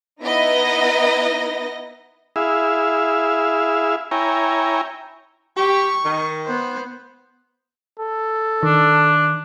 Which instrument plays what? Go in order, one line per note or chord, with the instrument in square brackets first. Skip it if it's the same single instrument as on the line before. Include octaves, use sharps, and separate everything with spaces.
[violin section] B3 D#4 E4 B4 D#5 A#6
[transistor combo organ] E4 G#4 E5 F5
E4 C#5 G5 G#5 A#5
[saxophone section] G4 [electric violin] C#6
[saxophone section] D#3
[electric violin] B3 C5
[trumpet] A4
[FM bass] D#3 [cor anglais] D4